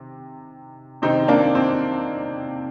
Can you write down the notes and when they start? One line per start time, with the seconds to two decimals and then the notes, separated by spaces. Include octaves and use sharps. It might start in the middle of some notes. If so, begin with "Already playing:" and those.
Already playing: C3 D#3
1.02 C3 D#3 C4 D#4
1.28 A#3 D4
1.55 C4